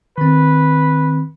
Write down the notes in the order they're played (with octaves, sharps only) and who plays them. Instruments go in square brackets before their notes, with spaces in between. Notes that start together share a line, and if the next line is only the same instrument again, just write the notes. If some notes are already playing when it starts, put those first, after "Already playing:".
[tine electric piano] D#3 C4 [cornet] B4